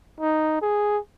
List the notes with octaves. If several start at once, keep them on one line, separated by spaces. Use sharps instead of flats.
D#4
G#4